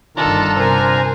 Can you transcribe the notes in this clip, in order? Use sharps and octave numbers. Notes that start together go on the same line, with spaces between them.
G1 D#3 D4 F4 A4 A#5
C3 A#4 C5 G#5